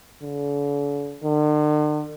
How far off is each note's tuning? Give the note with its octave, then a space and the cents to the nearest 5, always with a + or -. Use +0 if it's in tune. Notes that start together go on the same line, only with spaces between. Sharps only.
D3 -45
D3 +45